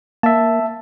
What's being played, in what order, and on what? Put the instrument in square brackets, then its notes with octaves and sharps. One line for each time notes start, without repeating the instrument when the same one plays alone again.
[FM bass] A#3 [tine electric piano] E5 A5